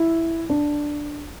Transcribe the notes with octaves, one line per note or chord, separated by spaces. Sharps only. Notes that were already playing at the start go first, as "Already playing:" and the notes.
Already playing: E4
D4